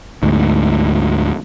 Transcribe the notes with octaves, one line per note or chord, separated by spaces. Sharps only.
D2 G#2